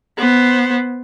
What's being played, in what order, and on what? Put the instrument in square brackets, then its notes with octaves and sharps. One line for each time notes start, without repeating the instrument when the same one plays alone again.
[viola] B3 C5